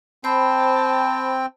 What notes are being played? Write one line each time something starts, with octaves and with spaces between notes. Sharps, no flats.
C4 C5 G5 A5 B5